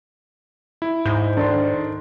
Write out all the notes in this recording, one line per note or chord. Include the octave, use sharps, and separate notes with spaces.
E4
G#2 G6
D#3 D4 A4 C6